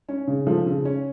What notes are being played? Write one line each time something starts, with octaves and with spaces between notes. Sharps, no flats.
C#4
C#3
F3 A4
C#3
C#4